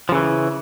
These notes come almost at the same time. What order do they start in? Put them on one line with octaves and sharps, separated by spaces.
F3 C#3 E3